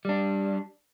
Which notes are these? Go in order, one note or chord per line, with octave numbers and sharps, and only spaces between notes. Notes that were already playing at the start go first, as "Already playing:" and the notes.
G3 D4